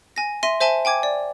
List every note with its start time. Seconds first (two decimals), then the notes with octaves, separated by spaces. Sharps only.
0.16 G#5 A#6
0.43 E5 C6 A#6 D#7
0.60 C5 E5 G#5 A5 G7
0.85 G5 G#5 D6 G#6
1.03 D5